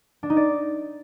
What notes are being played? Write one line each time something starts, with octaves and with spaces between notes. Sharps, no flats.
D4
D#4
D5